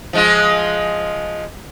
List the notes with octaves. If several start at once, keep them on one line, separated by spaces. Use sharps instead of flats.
F3 G#3 F4